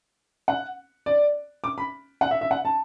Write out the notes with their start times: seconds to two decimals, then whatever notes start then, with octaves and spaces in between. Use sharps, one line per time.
0.48 F#5
1.06 D5
1.64 D6
1.78 B5
2.21 F#5
2.31 E5
2.41 E5
2.51 F#5
2.65 A5